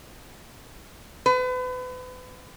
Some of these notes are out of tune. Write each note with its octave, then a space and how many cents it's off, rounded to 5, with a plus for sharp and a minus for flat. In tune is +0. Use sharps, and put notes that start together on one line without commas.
B4 +35